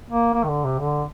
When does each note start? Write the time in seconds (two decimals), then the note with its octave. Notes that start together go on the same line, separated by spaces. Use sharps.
0.10 A#3
0.34 A#3
0.44 D#3
0.48 D3
0.64 C3
0.79 D3